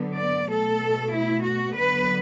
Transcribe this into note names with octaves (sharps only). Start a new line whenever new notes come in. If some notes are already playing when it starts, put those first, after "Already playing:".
Already playing: D3 F#3 B3
D5
B2 A3 A4
E4
F#4
D3 F#3 B3 B4